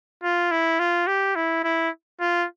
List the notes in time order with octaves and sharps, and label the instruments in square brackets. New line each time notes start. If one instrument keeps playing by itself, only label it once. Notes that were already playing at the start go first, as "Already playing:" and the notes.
[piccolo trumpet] F4
E4
F4
G4
E4
E4
F4